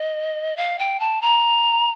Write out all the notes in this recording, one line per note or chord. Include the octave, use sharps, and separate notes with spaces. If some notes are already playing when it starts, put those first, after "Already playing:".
Already playing: D#5
F5
G5
A5
A#5